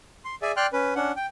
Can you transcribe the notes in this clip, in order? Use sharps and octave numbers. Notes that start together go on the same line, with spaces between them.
C6
G#4 D5 E5 G#5
D5 G5 C6 F6 F#6
C#4 B4
C#4 D4 F#5
G5